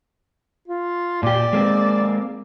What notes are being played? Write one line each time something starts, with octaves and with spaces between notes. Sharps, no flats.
F4
A#2 G4 D5
G#3 A#3 C4